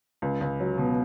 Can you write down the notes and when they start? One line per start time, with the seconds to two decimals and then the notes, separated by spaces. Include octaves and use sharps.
0.22 C#2
0.41 C#2
0.60 F#3
0.78 B2